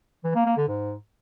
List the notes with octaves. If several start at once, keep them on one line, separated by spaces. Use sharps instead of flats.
E3
A#3
A#3
D3
G#2